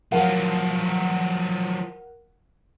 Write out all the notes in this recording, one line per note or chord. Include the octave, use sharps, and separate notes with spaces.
F3 F#3 A#4 F5 F#5